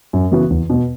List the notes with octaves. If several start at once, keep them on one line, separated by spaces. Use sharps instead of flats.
F#2
C#3 E3 B3 F#4
E2
B2 B3